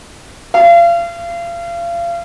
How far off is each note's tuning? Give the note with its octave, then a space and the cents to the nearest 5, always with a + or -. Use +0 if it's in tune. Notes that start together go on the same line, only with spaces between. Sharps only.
F5 -35